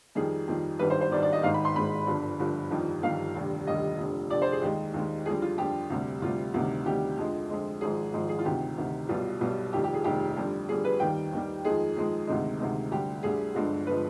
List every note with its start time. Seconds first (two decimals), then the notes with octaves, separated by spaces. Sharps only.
0.15 F2 D#3 G3 G#4
0.47 F2 D#3 G3
0.79 G#1 G2 D#3 G3 B4
0.90 C5
1.01 C5
1.11 G#1 G2 D#3 G3 D5
1.22 D5
1.33 D#5
1.43 G#1 G#2 D#3 G#3 F5
1.54 B5
1.65 C6
1.75 G#1 G#2 D#3 G#3 B5
2.07 G1 G2 D3 F3
2.39 G1 G2 D3 F3
2.71 G1 F2 D#3 G3
3.03 G1 F2 D#3 G3 F5
3.35 F1 D#2 D3 G3
3.67 F1 D#2 D3 G3 D#5
3.99 F1 F2 D3
4.30 F1 F2 D3 D5
4.42 C5
4.52 G#4
4.62 D#2 D#3 G#3 G4
4.94 D#2 D#3 G#3
5.26 F2 D3 G3 G#4
5.42 F4
5.58 F2 D3 G3 G4
5.90 D2 C3 G3
6.22 D2 C3 G3 F4
6.54 D2 C3 D#3 G3
6.85 D2 C3 D#3 G3 G4
7.17 F2 D3 F3 G#3
7.50 F2 D3 F3 G#3
7.81 G#1 G#2 F3 G#3 G#4
8.14 G#1 G#2 F3 G#3
8.29 G#4
8.39 F4
8.45 D2 C3 D#3 G4
8.77 D2 C3 D#3
9.09 B1 B2 G3 F4
9.41 B1 B2 G3
9.73 F1 F2 D#3 G3 G4
9.84 G4
9.94 G#4
10.04 F1 F2 D#3 G3 G4
10.36 F2 D3 G3
10.68 F2 D3 G3 G#4
10.85 B4
11.00 D#2 D#3 G3 G5
11.33 D#2 D#3 G3
11.65 F2 D#3 G#3 G#4
11.96 F2 D#3 G#3
12.27 D2 C3 D#3 G#3
12.59 D2 C3 D#3 G#3
12.92 D2 D3 G3 G4
13.23 D2 D3 G3 G#4
13.55 G1 G2 D3 F3 G#3
13.87 D3 F3 G#3 B4